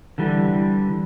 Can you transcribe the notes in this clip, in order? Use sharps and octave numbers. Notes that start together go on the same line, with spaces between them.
D3 E3 G3